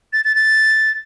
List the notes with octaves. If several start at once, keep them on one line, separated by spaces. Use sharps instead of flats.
A6
A6
A6